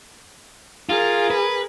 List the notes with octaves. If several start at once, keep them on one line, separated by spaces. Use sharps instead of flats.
F4 G#4 A#4
B4